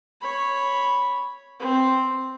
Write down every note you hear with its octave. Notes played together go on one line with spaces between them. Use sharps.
C#5 B5
C4